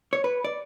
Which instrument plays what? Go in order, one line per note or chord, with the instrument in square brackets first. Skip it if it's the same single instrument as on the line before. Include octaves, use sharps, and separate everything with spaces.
[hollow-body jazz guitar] C#5
B4
D5